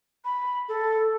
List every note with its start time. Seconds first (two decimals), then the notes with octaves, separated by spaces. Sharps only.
0.25 B5
0.69 A4